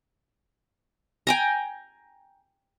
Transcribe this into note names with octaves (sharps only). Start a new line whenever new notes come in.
G5 G#5 A#5